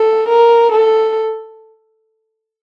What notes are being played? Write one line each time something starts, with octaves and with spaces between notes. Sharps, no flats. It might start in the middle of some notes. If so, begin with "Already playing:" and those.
Already playing: A4
A#4
A4